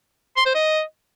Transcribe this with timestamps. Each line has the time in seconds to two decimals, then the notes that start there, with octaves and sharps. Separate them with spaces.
0.37 C6
0.46 C5
0.55 D#5